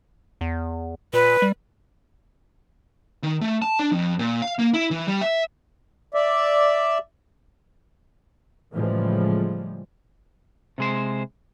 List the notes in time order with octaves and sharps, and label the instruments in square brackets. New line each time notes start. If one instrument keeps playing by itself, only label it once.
[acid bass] E2
[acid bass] A#2 [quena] B4
[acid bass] G3
[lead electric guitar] D#3
A3
A5
D4
F2
A#2
F5
A#3
E4
E3
G3
E5
[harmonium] D5 E5
[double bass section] A2 C#3 E3 F3 G3 G#3
[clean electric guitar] C3 G#3 C5